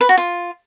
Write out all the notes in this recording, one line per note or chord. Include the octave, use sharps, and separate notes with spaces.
B4
F#4
F4